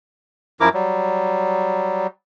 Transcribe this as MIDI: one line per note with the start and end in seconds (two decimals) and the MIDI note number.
0.60 0.69 42
0.60 0.69 53
0.60 0.69 64
0.60 0.69 70
0.60 0.69 86
0.74 2.07 54
0.74 2.07 55